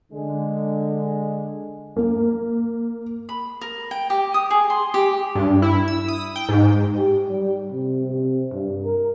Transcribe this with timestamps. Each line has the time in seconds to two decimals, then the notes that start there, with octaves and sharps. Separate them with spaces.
0.11 D3 G#3
1.97 A#3
3.29 B5
3.61 A#4
3.91 G5
4.10 G4
4.34 D#6
4.50 G#4
4.70 C6
4.94 G4
5.35 G2
5.62 E4
5.88 E6
6.08 D#6
6.36 G5
6.49 G#2
6.97 G4
7.29 G3
7.72 C3
8.07 C3
8.52 G2
8.85 A#4